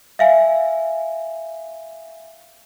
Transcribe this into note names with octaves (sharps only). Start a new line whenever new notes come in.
E5 F5 G#5